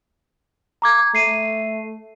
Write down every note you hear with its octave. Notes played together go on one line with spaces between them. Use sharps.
A#5 D6 G#6
A3 C7 D#7